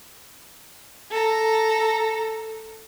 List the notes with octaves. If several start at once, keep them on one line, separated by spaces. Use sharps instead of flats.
A4 A#5